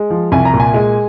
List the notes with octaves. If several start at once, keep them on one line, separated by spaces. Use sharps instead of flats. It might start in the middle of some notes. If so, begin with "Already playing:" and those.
Already playing: G#3
F3
C2 G#5
A#5
A#2
G#5
G#3